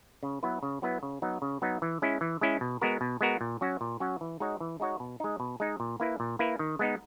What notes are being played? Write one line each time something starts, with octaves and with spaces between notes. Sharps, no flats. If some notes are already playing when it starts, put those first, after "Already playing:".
C#3
F#3 B3 E4 B4
C#3
F#3 B3 E4 B4
C#3
F#3 B3 D#4
C#3
F#3 B3 D#4
E3
G#3 C#4 E4
E3
G#3 C#4 E4
B2
G#3 B3 F#4 A#4
B2
G#3 B3 F#4 A#4
A#2
F#3 C#4 F#4
A#2
F#3 C#4 F#4
E3
G#3 D#4 F#4 C#5
E3
G#3 D#4 F#4 C#5
B2
G#3 D#4
B2
G#3 D#4
A#2
A#3 E4 B4
A#2
A#3 E4 B4
D#3
G#3 B3 D#4